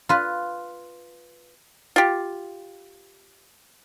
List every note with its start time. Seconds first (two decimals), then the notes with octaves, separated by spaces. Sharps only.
0.09 F4 B4
1.96 F4 G4